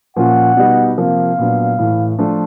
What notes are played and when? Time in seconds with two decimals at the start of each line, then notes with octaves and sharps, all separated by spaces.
0.16 A#2 F3 A#3 C#4 F4 F#5
0.57 B2 G3 B3 D#4
0.97 C3 F3 A#3 F5
1.39 A#2 F#3 B3 D4
1.78 A2 E3 A3
2.19 F3 A3 D4 F4